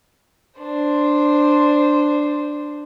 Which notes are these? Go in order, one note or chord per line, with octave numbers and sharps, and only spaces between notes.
D4 C5